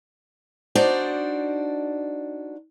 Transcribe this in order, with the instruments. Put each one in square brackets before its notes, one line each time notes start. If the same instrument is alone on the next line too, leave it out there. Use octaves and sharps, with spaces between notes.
[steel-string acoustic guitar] D4 D#4 F#4 C5 D5